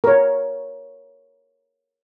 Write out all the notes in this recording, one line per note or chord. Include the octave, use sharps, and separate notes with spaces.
A#4 C#5